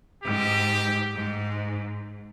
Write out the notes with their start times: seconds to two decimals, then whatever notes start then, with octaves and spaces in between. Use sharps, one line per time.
0.24 G#2 G4
1.16 G#2